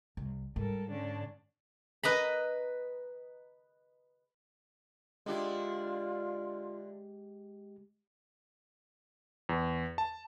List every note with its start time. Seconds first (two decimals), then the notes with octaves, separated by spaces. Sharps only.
0.17 C2
0.56 G#2 G3 A4 A#4
0.90 D3 C#4 D4
2.03 B4 D#5 A#5 B5
5.26 D3 G#3 D4 E4 F4 G4
9.49 E2
9.98 A5